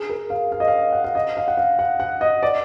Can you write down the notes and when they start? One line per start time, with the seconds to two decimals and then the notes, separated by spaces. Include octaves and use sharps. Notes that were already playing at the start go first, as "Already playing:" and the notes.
Already playing: G#4
0.10 A#4
0.30 F5
0.52 F5
0.60 D#5
0.68 F5
0.92 F#5
1.04 F5
1.15 D#5
1.37 F5
1.48 F#5
1.57 F5
1.79 F#5
2.00 F#5
2.21 D#5
2.43 D5